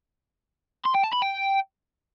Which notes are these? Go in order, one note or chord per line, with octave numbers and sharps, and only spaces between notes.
C6
G5
A5
B5
G5